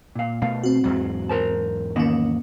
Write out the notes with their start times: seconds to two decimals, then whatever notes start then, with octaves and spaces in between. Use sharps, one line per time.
0.15 A#2 F5
0.42 B2 A3 F5
0.64 C4 F#4
0.84 E2 G#2 F#3
1.29 A#4 C5 A5
1.96 D#3 A#3 B3 C#4 D#5